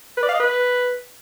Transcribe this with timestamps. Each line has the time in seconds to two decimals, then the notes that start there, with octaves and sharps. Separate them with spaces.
0.17 B4
0.23 D5
0.29 F5
0.34 D#5
0.40 B4